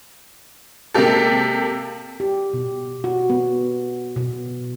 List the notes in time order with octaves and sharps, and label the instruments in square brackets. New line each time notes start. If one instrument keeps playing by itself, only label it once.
[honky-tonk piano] C3 G#3 A#3 G4 A4
[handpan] G4
B2
F#4
B3
B2